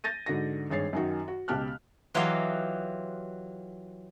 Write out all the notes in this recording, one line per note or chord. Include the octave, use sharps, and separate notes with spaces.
G6 A6 A#6 D#7
G#2 D3 F#4 A#6
G#1 G2 G#4 C#5 A6 C7
F#2 D#3 F#4
F#4
C#2 B2 G4 A5 F6 F#6
E3 F#3 F4 G4 D#5 F5